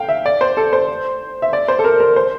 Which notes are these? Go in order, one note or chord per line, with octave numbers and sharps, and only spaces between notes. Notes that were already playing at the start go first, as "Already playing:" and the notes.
Already playing: F5 G5
E5
D5
C5
A4
C5
E5
D5
C5
A4
A#4
A#4
C5